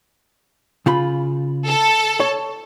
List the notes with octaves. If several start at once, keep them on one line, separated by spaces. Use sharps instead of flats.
C#3 F4 B5
A4 A5
C#5